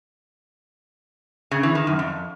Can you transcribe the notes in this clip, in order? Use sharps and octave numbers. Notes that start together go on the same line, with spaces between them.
C#3
E3
D#3
F#2
F2